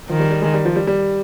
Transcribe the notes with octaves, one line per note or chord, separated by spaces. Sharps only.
D#3 F3
G3
G3
G#3
G3
F3
G3
G3